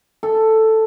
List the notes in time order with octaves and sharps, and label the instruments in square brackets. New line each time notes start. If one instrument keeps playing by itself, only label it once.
[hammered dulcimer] A4